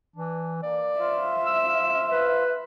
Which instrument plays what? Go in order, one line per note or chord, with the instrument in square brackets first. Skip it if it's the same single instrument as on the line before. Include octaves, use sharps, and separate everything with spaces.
[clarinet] E3 [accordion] D4
[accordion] A#3 [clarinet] D5
[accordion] F4 C5 F5 [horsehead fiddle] E5
[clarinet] E6
B4